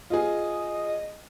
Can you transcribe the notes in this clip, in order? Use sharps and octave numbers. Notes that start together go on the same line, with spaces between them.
F4 G#4 D#5